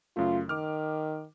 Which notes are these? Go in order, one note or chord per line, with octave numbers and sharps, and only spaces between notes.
F#2 C#3 A3 F4
D#3 D6 F6